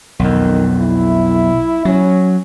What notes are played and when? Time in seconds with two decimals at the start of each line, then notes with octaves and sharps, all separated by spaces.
0.19 B1 F2 D#3
0.79 E4
1.85 F#3 C#4